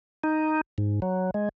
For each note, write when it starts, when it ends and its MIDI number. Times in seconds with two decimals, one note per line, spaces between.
0.23 0.61 63
0.78 1.00 44
1.02 1.31 54
1.34 1.49 56